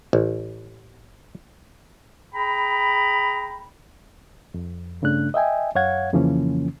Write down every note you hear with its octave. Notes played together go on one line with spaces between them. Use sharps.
A1
G#4 G5 A#5 B5
F2
G2 C#3 A3 D4 F#6
D#5 E5 G5 G#5
F#2 C#5 F5 F#5 G#6
F2 C#3 E3 F3 A#3 C#4